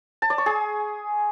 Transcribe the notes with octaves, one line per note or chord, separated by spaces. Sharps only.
A5
D5
C#6
G#4